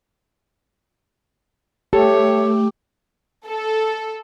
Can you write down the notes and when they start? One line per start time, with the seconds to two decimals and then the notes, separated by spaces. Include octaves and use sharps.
1.93 A3 G4 A4 C#5 E5
3.46 A4